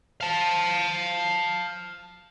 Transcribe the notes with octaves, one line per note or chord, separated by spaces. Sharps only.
F5 A5